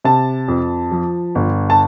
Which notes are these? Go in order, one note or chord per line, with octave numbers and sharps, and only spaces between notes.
C3 A5
F2
F3
G1
A5